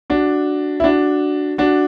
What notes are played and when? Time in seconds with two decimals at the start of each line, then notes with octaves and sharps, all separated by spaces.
0.10 D4 F#4
0.80 E4
0.84 D4 F#4
1.58 D4 F#4